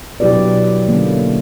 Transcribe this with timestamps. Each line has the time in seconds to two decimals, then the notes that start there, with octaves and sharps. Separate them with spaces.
0.20 B2 F#3 E4 G4 B4 D5
0.86 D3 E3 A3 A#3 C#4